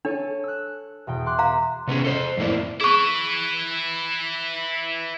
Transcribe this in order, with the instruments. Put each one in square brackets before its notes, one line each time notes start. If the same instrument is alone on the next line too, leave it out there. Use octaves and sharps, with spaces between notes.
[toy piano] D4 [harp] A4 C#5 G#5
[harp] E6 F#6
E2 B2 G5
C6 D6 F#6
[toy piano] F5 A#5
[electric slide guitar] C3 B3 C#4 G#4
A4 C5
F2 A2 A#3 E4 D5
[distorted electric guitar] E4 B4 [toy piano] G#4 C#6